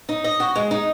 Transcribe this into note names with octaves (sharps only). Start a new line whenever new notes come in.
D#4
D#5
F#4
G#3
D#4